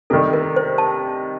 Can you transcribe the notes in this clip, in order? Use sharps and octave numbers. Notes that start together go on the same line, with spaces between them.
C3 D#3 G3 A4
A#4
C5
A5